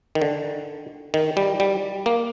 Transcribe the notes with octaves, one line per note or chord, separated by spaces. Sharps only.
D#3
D3
D#3
G3
G3
A#3